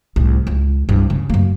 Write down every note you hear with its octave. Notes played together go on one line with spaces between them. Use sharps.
C2 A2
C#2
C2 G2
C#3
F#2 A#3